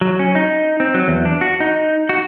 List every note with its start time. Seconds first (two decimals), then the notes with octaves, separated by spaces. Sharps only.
0.01 F#3
0.19 C#4
0.35 D#4
0.80 C4
0.94 F#3
1.08 E2
1.25 D4
1.41 F#4
1.60 D#4
2.09 F#4